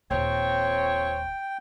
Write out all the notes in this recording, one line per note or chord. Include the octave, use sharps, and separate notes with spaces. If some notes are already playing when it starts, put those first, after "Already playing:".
D#1 F2 C4 C#5 G5